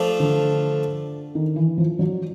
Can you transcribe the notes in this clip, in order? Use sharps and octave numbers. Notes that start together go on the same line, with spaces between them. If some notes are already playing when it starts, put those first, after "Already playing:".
Already playing: F3 A3 D4 F4
D3
D#3
E3
F3
F#3